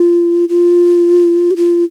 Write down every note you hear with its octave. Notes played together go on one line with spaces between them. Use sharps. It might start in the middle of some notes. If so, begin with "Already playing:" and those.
Already playing: F4
F4
G4
F4